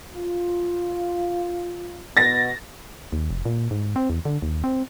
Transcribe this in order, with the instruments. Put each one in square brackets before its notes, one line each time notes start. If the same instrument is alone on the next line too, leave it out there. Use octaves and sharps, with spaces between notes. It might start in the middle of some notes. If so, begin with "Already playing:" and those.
[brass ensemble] F4
[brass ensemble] B2 B3 [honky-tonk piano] A6 A#6
[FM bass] D#2
F1
A#2
G#2
C4
E2
D3
D#2
C4